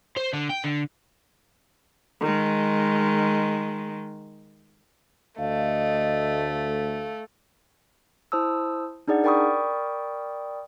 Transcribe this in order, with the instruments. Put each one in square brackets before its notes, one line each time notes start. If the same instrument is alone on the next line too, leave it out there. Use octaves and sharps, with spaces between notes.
[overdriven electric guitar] C5
D3
G5
D3
[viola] D#3 G#3
[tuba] D2 [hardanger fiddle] A3 [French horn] D#5 [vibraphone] F5
[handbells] E4 C5 A5 D#6 E6
D4 D#4 G#4 D5 F#5
A#4 D5 G5 B5 C#6 D#6